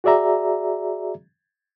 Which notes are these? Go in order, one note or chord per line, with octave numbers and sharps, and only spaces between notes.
F#4 G#4 D5 E5 A#5